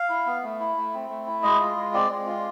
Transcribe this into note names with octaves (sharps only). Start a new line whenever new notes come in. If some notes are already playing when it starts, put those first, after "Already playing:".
Already playing: F5
E4
B3
A3
E4
A3
C4
A3
E4
G#3 D#5
F4
G#3
C4 D5
G#3
F4